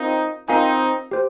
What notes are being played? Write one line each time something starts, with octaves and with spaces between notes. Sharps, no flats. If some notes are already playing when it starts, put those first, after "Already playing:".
Already playing: C4 D#4 F4 A#4 F5
C4 D#4 F4 A#4 F5 G#5
G4 C5